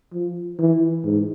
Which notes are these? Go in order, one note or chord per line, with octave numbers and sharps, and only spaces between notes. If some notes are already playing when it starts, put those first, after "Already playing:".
F3
E3
G#2